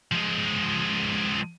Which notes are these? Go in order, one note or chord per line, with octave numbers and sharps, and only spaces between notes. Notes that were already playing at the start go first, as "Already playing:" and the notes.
F3 G#3